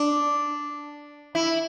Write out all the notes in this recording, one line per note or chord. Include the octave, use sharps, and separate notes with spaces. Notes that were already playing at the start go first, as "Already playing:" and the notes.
Already playing: D4
E4